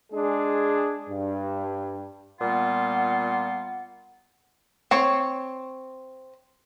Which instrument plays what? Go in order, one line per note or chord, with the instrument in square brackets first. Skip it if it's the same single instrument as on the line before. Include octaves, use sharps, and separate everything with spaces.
[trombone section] G#3 D4 G#4
G2
[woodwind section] A#2 G3 B3 F4 F#5
[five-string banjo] C4 C#5